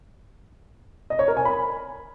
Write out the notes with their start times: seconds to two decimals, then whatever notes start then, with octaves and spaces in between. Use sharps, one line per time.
1.10 D#5
1.19 C#5
1.28 A#4
1.37 G#5
1.45 B5